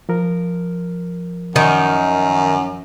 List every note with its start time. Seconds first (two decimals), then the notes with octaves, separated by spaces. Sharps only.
0.09 F3 A#4
1.56 F#2 D#3